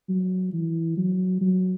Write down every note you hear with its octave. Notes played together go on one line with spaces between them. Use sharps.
F#3
E3
F#3
F#3